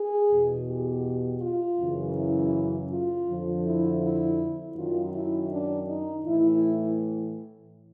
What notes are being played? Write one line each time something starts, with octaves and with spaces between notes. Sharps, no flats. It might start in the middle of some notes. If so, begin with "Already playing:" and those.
Already playing: G#4
E2 B2
G4
F4
F#2 C#3 E3
E4
F4
F2 D3 F3
E4
E4
F#2 D#3 F4
E4
D4
D#4
A2 E3 E4